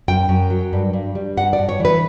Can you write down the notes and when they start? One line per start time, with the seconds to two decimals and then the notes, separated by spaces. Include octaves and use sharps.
0.08 F#2 G5
0.29 F#2
0.50 F#3
0.73 G2
0.93 G2
1.15 G3
1.37 G2 F#5
1.53 D5
1.59 G2
1.69 C#5
1.80 E3 B4